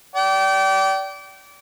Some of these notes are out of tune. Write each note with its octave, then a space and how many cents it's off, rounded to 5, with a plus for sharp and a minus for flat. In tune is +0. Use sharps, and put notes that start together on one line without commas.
D5 -25 G5 -30